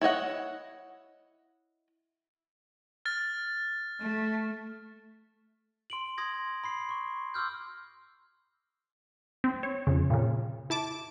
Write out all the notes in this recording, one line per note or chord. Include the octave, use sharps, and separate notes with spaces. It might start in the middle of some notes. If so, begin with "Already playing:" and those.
E4 C#5 D#5 F#5
F6 A6
A3
C6 D7 F#7
C6 D#6 G#6 A#6
B5 C6 C7
C6 C#6
C6 D6 E6 F6 G6
C4
C#5
F2 C#3
A#2 C#3
E4 A5 D6